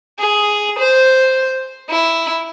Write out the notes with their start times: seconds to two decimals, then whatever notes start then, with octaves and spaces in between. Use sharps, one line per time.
0.19 G#4
0.79 C5
1.89 E4